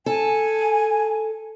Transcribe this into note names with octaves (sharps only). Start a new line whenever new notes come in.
A4 G#5